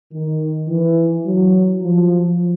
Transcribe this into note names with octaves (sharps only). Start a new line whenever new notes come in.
D#3
E3
F#3
F3